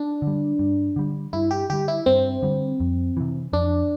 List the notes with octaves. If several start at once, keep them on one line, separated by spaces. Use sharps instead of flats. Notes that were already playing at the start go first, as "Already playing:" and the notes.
Already playing: D4
D3 G3
G2
D3 G3
G2 E4
G4
D3 G3 G4
E4
G2 C4
D3 G3
F2
C3 E3
F2 D4